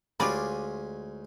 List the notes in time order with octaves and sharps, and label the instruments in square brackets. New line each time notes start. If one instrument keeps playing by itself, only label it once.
[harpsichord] D2 C#4 G#5 [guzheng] G#3 F4 D5 [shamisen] G4 B5